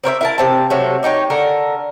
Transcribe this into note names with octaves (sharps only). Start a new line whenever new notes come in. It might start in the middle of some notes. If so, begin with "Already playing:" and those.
C4 A#4 C#5 E5
E4 A#4 A5
C3 C4 A5
C3 F#3 A3
D4 D#4 G4 C#5
D3 A4 A#4